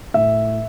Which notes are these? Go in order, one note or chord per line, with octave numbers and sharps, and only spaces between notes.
A2 E5